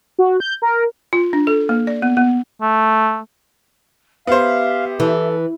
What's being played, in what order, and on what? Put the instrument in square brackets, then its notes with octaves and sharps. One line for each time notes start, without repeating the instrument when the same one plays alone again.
[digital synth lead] F#4
G6
A#4
[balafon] F4
D4
A4
A#3
D5
B3
B3
[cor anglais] A3
[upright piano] B3 C5 [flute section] G4 E5 [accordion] F5
[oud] E3 [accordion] A4